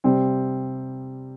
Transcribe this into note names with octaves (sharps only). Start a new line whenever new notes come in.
C3 G3 C4 G5